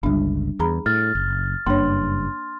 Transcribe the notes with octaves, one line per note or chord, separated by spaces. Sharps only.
G1 C#2 G3 D4
E2 G#4 A#5 B5
A2 F6 A6
F#1
F#1 G2 A#3 D4 C#5 C6